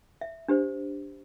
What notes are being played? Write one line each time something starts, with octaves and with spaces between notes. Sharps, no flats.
E5
D4 G4 C5